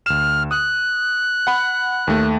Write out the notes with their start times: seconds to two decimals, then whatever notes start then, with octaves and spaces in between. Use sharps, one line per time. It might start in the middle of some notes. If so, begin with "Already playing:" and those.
0.06 D2 F6 E7
0.51 D#6 F#6
1.47 F#5 B5
2.07 D#2 A3